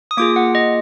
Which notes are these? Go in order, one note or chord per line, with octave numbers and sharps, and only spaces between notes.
D#6
A#3 F4 G#4 D6
F#5
D#5